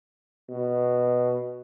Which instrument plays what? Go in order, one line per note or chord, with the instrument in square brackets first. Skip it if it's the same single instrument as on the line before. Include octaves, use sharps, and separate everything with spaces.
[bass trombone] B2